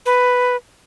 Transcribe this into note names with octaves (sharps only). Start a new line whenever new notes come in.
B4